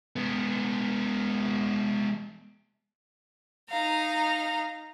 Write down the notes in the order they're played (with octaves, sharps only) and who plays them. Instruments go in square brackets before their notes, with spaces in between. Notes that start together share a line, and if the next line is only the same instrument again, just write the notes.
[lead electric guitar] G#3 B3
[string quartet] D#4 F5 A#5